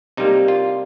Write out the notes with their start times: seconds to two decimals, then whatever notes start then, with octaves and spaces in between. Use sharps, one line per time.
0.17 C3 G3 A#3 D#4
0.48 F4